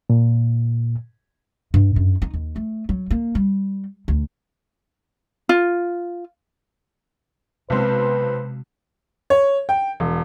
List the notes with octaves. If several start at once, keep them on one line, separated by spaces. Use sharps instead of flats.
A#2
G2
F#2
D#4
D#2
A3
F#3
A#3
G3
D2
F4
B1 C3 G#3 C4 B4
C#5
G5
E1